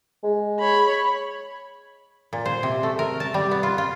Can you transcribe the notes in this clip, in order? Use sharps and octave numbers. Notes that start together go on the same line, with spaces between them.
G#3
C#5 B5
A#2
C5
C3
A3
A#4
A5
G3
B3
F4
F4